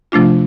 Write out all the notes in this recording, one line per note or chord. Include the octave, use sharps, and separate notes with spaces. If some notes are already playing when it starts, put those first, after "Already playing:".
C3 F3 A3 D4 F4